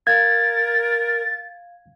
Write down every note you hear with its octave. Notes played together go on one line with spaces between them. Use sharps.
A#4 F5 G#6 A6